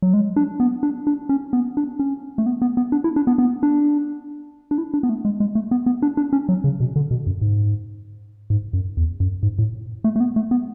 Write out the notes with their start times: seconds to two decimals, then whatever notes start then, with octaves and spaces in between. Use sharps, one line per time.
0.02 F#3
0.14 G#3
0.36 D4
0.60 B3
0.83 D4
1.07 D4
1.29 C#4
1.53 B3
1.77 D4
1.99 C#4
2.38 A3
2.46 B3
2.62 B3
2.77 B3
2.92 D4
3.04 E4
3.16 D4
3.27 B3
3.38 B3
3.63 D4
4.71 D4
4.78 E4
4.94 D4
5.03 B3
5.10 A3
5.25 G#3
5.40 G#3
5.55 A3
5.71 B3
5.86 B3
6.02 D4
6.17 D4
6.33 C#4
6.49 F#3
6.64 C#3
6.80 B2
6.96 D3
7.11 B2
7.27 F#2
7.42 G#2
8.50 G#2
8.73 F#2
8.97 E2
9.20 F#2
9.43 G#2
9.59 A2
10.04 A3
10.16 A3
10.20 B3
10.36 A3
10.51 B3